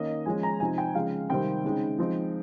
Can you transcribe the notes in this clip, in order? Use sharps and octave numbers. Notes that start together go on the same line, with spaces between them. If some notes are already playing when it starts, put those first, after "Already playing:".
Already playing: D#3 A#3 C#4 D#5
F3 G#3 C#4 G#5
A#5
C3 F3 C4 D#4 G#5
G5
C#3 F3 G#3 F5
C3 D#3 G3 C4 G5
C#3 G#3 C4 D#4
F3 G#3 C4 D#4